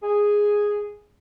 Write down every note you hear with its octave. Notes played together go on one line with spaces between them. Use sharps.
G#4